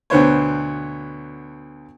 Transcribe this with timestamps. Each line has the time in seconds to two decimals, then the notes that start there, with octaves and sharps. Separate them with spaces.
0.10 D2 B2 D3 B3 C5 C#5